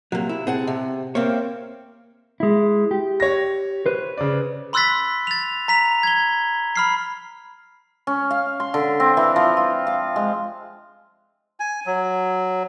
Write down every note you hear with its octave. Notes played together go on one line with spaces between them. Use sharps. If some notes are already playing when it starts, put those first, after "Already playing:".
C3 F#3 A#3
E4
C4 G#4 F#5 A5
C3
A#3 C4 C#5 E5 F5
G#3 E4
G4
C#5 A#6
B4 C5
C#3 D5
B5 C6 E6 F#6 A6 B6
A6 F7
A#5 B6 F7
G#6 G7
B5 F6 C7
C#4
F5
C6
D3
C4
E3
F3
F4
F5
G#3
G#5
F#3